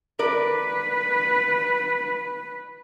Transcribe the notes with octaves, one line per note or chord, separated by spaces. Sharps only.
A#4 B4 D5